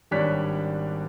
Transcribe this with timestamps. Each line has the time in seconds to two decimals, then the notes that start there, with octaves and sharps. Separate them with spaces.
0.11 G#1 G3 D4 C#5 F#6 B6